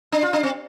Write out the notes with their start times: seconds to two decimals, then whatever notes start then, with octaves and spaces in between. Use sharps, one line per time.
0.12 D4
0.23 F4
0.33 D4
0.43 C4